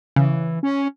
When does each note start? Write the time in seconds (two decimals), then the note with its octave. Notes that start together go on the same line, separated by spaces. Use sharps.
0.16 C#3 E3
0.63 C#4